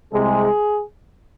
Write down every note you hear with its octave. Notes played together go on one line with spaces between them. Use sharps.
C2 C3 G#3 G#4